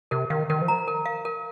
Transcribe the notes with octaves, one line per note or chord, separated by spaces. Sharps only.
C3 A#4
D#3 F5
D#3 A#4
F3
A#5
A#4
F5
A#4